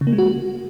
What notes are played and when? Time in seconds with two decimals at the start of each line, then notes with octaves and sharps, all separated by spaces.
0.01 C#3
0.07 A#3
0.13 G#3
0.18 F#4